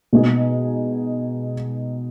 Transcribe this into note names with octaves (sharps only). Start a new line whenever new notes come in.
B2 G#3 D#4 G#4